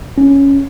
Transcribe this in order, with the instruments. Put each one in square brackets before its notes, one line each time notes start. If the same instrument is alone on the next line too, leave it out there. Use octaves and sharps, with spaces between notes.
[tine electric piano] C#4